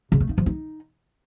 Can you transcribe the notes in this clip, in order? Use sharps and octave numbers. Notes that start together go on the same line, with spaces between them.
C#3
A3
D#4
F3
D#4